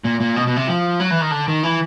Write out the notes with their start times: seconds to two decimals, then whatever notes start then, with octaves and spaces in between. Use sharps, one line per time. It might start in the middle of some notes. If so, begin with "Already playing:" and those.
0.04 A#2
0.20 A#2
0.36 B2
0.47 B2
0.56 C3
0.67 F3
1.00 F#3
1.10 E3
1.21 D#3
1.31 D3
1.48 D#3
1.63 E3